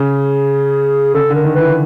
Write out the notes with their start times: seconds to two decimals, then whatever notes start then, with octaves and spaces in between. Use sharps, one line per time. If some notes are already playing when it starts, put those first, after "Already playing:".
Already playing: C#3 G#4
1.14 C#3 A4
1.30 D3
1.35 A#4
1.45 D#3
1.55 E3 B4